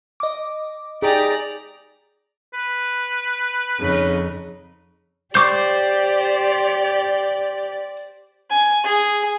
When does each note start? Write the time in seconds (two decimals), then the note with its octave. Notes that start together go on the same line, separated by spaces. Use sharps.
0.20 D#5 D6
1.02 D#4 G4 G#4 D5 A#5
2.54 B4
3.80 F2 C#3 D#4
5.35 G4 C5 D5 C#6 D6 G6
8.50 G#5
8.84 G#4